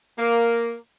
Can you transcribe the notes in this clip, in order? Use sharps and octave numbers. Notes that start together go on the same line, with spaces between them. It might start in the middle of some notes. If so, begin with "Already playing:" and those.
A#3